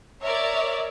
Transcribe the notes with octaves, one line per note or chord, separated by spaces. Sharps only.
A#4 C#5 D5 E5